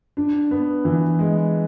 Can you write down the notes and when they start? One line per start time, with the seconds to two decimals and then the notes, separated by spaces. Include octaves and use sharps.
0.17 D4
0.51 B3
0.85 E3
1.19 G#3